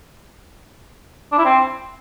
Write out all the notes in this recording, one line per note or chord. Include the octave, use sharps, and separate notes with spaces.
D4
E4
C4